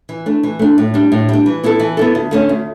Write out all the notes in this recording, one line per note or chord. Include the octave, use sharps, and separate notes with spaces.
E3
A3 D4
E3
A3 D4
A2
G3 D4
A2
G3 D4
E3
B3 E4 A4
E3
B3 E4 A4
D2
D3 A3 C#4
D2